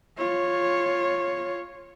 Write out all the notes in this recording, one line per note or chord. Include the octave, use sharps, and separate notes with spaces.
F4 C#5